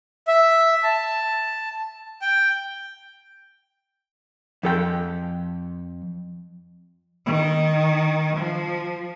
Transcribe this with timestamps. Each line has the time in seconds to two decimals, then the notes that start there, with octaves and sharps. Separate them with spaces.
0.27 E5
0.83 A5
2.22 G5
4.63 F2 A4 G5
7.26 D#3
8.36 F3